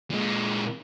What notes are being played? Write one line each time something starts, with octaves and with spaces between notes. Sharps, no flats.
A#2 G#3